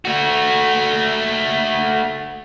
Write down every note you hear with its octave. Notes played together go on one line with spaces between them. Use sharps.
A3 F#4